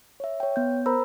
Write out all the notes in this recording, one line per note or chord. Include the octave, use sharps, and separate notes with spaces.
C#5 E5
C#5 G5
B3 G6
A#4 C5 A#5 B5 E6